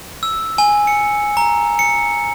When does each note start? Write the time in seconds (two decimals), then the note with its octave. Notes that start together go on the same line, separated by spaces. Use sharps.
0.23 E6
0.58 G#5
0.87 C#7
1.37 A#5
1.79 C#7